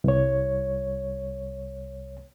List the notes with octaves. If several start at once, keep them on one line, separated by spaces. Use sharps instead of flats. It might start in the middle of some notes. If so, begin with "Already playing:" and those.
C2 C#5